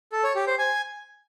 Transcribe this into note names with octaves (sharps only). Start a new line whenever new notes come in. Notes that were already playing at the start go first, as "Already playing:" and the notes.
A4
C#5
G4
C5
G#5